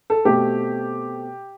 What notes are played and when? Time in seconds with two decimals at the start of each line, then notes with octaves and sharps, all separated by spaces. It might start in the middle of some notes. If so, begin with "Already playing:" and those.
0.10 A4
0.25 B2 A3 C4 G4